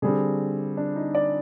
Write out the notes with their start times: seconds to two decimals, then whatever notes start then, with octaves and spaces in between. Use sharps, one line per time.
0.02 D3 G3 C4 G#4
0.77 D4
0.96 D#4
1.15 D5